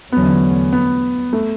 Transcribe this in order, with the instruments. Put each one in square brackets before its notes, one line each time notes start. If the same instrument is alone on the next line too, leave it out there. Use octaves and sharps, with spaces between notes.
[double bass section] E2 D3 F#3 A3 C#4 [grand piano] B3
[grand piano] B3
A3